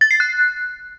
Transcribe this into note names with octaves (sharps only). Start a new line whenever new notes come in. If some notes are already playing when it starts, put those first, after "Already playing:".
A6
C7
F#6